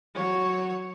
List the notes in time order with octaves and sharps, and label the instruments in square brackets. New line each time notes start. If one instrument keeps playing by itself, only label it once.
[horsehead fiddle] F#3 C#5